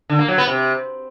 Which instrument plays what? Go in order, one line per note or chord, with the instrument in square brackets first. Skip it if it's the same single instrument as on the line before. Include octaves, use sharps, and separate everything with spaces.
[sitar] D3
A#3
F#3
B3
C3